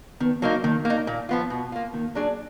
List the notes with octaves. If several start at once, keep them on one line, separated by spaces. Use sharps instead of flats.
D#3 B3
F#3 A#3 D#4
D#3 A#3
A#3
D#4
A#2
F3 B3 F4
B2
A#3 F4
D#3 A#3
F#3 D4 G#4